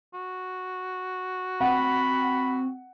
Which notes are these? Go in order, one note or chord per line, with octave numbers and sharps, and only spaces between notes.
F#4
C4 F#5 B5